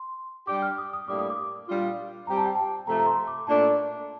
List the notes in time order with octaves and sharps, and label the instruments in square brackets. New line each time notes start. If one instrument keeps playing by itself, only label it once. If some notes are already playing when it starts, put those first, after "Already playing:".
Already playing: [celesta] C6
[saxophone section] G3 D4 G4 [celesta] D6
[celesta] F6
D#6
D#6
[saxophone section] A2 G3 A#3 D4 G4 [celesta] D6
[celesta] D#6
D6
[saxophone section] A#2 G3 D4 F4
[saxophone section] G3 C4 G4 [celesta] A#5
[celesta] A5
G5
A5
[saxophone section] C3 F3 A3 [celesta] A#5
[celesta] A#5
C6
D6
[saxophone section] A#2 A3 D4 [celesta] A5